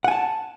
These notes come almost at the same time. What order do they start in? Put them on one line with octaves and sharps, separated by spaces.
F#5 G#5 A5